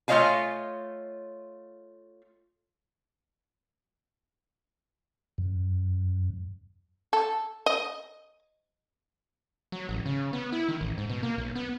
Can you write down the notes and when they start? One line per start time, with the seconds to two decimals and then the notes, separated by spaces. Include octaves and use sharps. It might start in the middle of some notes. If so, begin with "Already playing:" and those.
0.08 A3 F4 C#5 D#5 F5 G#5
5.38 F#2
7.13 A4
7.66 D#5
9.72 F#3
9.89 A1
10.06 C#3
10.33 B3
10.52 E4
10.69 D#3
10.81 A1
10.98 G#2
11.10 B2
11.23 A#3
11.38 B1
11.55 B3